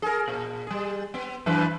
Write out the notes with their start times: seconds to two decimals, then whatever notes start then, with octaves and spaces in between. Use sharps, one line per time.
0.02 G#4 A#4
0.28 A#2
0.67 G3 G#4
1.14 B3
1.46 F#2 E3 B4